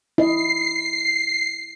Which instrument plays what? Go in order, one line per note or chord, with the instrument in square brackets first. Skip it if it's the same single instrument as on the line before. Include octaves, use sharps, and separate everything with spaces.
[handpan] E4 D#5 [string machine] C7